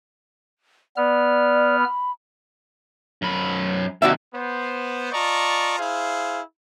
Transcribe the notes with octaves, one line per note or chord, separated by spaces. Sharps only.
B3 D5 F6
B5
F#2 B5
D#2 C3 F#4 D5 E5
B3 C5
F4 D5 D#5 A5 A#5 C#6
E4 G#4 C5 F5